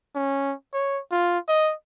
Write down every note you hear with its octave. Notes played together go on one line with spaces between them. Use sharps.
C#4
C#5
F4
D#5